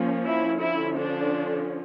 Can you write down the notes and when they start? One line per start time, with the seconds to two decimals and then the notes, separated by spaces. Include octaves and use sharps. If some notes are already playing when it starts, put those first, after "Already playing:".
Already playing: F3 A#3 C#4
0.25 E4
0.62 D3 F3 C#4 E4
0.99 D4